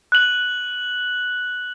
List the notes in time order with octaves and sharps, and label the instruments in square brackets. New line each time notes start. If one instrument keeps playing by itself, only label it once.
[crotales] F#6 F#7